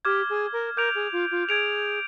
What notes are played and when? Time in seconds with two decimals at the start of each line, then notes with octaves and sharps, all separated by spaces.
0.05 G4 D6 F6 G#6
0.30 G#4
0.53 A#4
0.76 A#4 D6 G6 D7 F7
0.95 G#4
1.12 F4
1.31 F4
1.49 G#4 G#6 D7 F7